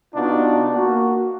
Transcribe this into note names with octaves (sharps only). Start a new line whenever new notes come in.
C3 B3 D4 D#4 F4 F#4
A#3 F#4